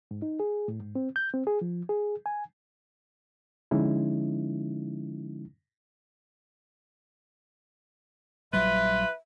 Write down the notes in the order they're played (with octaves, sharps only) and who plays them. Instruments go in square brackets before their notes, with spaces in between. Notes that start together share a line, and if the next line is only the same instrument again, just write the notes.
[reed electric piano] G#2
D#4
G#4
A2
G#2
C4
G6
C4
G#4
F3
G#4
G#5
D3 F3 G#3 C#4 D#4 E4
[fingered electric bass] A#1 F#3 G3 [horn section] F4 B4 [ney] E5